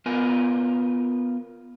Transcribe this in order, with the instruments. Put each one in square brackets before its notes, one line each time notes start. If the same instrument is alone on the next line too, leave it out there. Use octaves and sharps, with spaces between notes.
[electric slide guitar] B3 F4 A#4 G#5